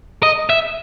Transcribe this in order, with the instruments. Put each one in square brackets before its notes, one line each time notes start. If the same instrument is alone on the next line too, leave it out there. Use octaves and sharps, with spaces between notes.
[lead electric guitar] D#5
E5